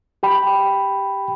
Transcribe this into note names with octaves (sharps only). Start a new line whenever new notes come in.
G4 G5 B5